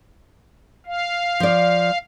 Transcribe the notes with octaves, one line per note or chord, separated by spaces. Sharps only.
F5
F3 D5